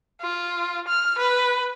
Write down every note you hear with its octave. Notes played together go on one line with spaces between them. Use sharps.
F4
F6
B4